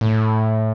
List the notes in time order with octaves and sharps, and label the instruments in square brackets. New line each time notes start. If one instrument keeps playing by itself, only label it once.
[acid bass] A2